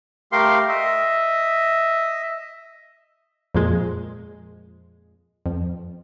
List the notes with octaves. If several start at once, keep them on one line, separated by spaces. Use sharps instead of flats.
A3 G4 A#4 F5 C6
D#5 E5
F2 A#2 F3 G#3
F2